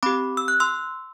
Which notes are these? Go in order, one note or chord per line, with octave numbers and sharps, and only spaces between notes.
C4 G4 B5 D6
E6
F#6
C6 E6